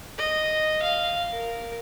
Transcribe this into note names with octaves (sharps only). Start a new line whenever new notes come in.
D#5
F5
A#4